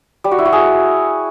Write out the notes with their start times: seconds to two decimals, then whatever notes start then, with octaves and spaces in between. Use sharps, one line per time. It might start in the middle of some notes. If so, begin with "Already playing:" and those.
0.24 G3
0.31 F#4
0.38 E4
0.46 F#4
0.53 G#4